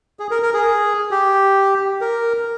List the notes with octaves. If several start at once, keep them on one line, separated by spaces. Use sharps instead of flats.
G#4
A#4
A#4
G#4
G4
A#4